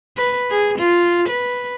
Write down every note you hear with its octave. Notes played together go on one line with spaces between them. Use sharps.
B4
G#4
F4
B4